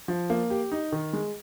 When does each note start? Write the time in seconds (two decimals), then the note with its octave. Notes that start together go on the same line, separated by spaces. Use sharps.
0.08 F3
0.30 A#3
0.50 G4
0.72 D#4
0.92 D#3
1.13 G#3